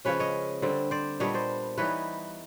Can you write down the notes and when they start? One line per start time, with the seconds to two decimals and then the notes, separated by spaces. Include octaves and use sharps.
0.05 C#3 F3 G#3 C#4 B4 C#5
0.20 C#5 D#5
0.62 D3 G3 C4
0.91 C5 D5
1.20 A#2 G3 B3 D4 C#5 D#5
1.34 C5 D5
1.78 E3 G3 B3 D#4 B4 C#5